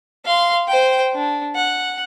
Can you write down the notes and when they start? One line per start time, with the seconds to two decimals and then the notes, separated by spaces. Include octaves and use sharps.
0.25 F5 C6
0.68 C5 G5
1.13 D4
1.55 F#5